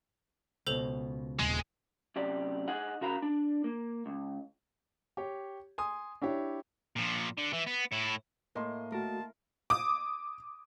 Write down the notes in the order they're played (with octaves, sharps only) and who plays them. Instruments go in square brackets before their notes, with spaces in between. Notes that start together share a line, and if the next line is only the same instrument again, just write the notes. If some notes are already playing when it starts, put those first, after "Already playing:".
[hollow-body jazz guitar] C#2 B2 [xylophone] A4 C5 F7
[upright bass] D#1 [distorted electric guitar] G#3
[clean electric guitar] F#2 C3 G4 D5
D#4 G#4 D#5 F#5
C#3 F#4 A#4 F5 A#5 B5
D4
A#3
C#2
[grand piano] G4 C#5
G#5 C6 D#6
D4 E4 G4 C#5
[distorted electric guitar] A#2 F3
D3
E3
B3
A2 E4
[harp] A2 [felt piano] A#3 D#5 C6
[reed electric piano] A3 F#4 [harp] A#4 [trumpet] A5
[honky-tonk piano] D6 D#6